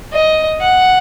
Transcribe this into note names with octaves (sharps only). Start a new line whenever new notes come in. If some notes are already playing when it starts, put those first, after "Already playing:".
D#5
F#5